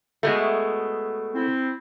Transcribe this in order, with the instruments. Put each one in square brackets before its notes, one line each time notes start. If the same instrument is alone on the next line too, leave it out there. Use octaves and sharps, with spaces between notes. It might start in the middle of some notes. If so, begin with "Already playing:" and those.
[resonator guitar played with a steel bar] B2 G#3 A3
[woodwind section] C4 E4